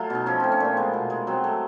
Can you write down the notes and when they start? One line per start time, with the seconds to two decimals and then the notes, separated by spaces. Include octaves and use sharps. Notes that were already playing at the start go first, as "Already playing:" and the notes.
Already playing: F#3 A3 F4
0.10 B2 D#4
0.26 F3 C#4
0.40 A3 C4
0.52 C#4
0.60 A#2 C4
0.77 G#3 B3
0.94 B2
1.10 G#3
1.27 F#3 C4
1.44 A3